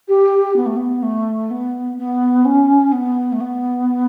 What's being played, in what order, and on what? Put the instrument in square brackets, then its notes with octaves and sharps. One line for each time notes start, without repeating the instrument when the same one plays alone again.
[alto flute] G4
B3
A3
B3
A3
B3
B3
C#4
B3
A3
B3